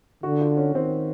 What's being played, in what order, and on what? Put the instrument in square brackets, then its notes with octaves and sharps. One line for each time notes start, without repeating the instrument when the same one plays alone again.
[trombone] D3 [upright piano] F#4
[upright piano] F4
C#4
[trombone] D#3 [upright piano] C4